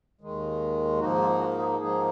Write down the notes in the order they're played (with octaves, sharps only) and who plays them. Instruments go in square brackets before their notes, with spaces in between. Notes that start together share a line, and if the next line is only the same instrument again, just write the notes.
[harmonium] D#2 D#3 G#3
G#2 F3 A#3 D#4 F#4
F4
F#4
G#4
G#2 F3 A#3 D#4 G#4